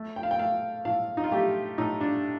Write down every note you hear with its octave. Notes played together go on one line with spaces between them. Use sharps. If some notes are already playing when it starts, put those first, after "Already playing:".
Already playing: A3
G5
F5
G5
A3 F5
A2 F5
D#4
F4
A3 G4
A2 D#4
D4